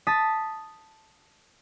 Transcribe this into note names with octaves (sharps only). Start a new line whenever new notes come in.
A5 D#6 A6 B6